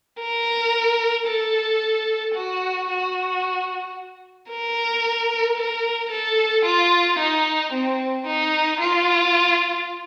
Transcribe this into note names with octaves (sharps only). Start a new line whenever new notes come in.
A#4
A4
F#4
F#4
A#4
A#4
A4
F4
D#4
C4
D#4
F4